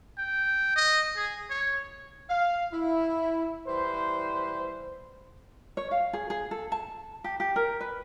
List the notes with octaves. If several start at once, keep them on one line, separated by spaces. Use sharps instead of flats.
G5
D#5
G#4
C#5
F5
E4
E3 G3 B4 C5
C#5
F5
G#4
G#4
A4
A5
G4
G4
A#4
B4